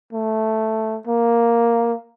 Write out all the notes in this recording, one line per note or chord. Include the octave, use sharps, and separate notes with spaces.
A3
A#3